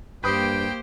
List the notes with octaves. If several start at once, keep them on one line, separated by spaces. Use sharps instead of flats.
G2 A#3 G4 B4 C5 G5 D#6